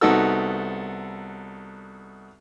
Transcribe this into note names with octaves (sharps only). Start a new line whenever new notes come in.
C2 B3 D#4 F#4 A4 E6